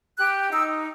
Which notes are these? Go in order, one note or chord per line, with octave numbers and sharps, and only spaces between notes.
G4 F#6
D#4 E6